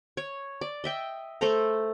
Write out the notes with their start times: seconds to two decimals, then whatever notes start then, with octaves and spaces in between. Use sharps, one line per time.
0.17 C#5
0.61 D5
0.84 D#5 E5 G5
1.41 A3 A4 C5 A#5